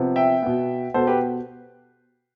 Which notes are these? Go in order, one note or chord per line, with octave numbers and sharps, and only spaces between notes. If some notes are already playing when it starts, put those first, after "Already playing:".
Already playing: C3 F3 B3
E5 G5
B2 B3
B2 B3 A4 C5
G4 B4